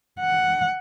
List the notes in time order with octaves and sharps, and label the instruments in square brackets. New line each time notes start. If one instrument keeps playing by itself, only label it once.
[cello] F#5